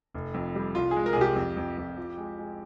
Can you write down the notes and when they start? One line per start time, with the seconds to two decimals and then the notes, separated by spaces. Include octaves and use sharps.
0.14 F1
0.34 F2
0.55 G3
0.75 C2 F4
0.91 G#4
0.96 G#3
1.06 A#4
1.13 G#4
1.16 C2
1.21 G4
1.36 F2
1.57 F2
1.78 F2
1.97 F3
2.17 G#3
2.39 G#3